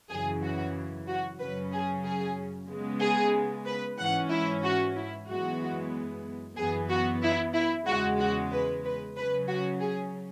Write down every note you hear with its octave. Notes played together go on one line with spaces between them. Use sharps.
F#2 C#3 E3 G#4
F#4
F#4
F#2 C#3 F#3 C#4 B4
G#4
G#4
C#3 G#3 B3
G#4
B4
G#2 E3 C#4 F#5
E4
F#4
E4
F#2 E3 G#3 B3 F#4
F#2 E3 B3 G#4
F#4
E4
E4
E2 C#3 G#3 F#4
F#4
B4
B4
C#3 F#3 C#4 B4
F#4
G#4